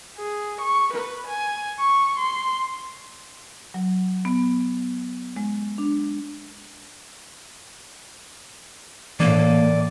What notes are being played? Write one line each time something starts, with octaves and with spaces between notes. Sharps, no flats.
G#4
C#6
B4
G#5
C#6
C6
F#3
B3
G#3
D4
A2 E3 A#3 D5 D#7